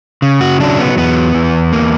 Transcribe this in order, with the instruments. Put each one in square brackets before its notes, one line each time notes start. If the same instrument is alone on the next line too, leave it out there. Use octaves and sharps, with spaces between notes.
[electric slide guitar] C#3
F#4
F#3 D4
B3
E2 B3
E2
A#3